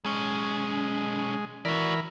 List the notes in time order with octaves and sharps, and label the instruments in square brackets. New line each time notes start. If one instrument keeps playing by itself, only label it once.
[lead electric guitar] B1 C#4 [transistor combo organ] G#3
[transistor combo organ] E3 A#4 B5 [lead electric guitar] F#4 D5